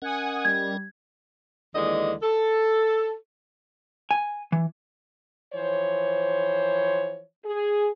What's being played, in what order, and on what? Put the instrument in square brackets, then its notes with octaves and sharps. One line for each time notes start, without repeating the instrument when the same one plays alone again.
[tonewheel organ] C#4 A#4 D#5 [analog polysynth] F#5 G#5 D#6
[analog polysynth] G3 [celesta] G#6
[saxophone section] D#2 D3 E3 G#3 D5 D#5
A4
[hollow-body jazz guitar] G#5
E3
[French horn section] E3 F3 C5 C#5
G#4